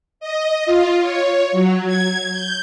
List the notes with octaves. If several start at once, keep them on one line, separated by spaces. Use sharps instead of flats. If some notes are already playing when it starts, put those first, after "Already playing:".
D#5
F4
C#5
F#3
G#6
G6